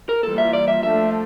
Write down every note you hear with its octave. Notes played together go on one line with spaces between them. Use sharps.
A#4
E3 G3 A#3 F4 A4
E5
D5
E5
F3 A3 D4 A4 E5